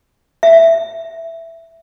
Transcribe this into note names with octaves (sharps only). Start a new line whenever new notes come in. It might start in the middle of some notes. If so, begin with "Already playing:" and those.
E5